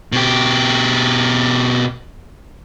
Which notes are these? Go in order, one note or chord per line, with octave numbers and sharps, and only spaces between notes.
B2 G4